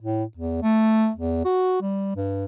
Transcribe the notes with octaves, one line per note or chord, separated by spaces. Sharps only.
A2
E2
A3
E2
F#4
G3
G2